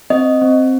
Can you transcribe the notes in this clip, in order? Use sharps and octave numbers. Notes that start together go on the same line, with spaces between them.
C4 D#5
C4